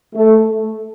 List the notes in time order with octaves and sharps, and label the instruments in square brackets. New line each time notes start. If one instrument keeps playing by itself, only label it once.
[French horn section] A3